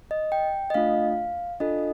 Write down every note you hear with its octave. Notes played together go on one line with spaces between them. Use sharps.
D#5
G5
D#5
A3 D4 F4 F5
D4 F4 A4 D#5